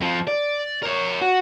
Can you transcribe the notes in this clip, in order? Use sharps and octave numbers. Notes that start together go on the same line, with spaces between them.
F2 F3
D5
A#4 C#5
F#4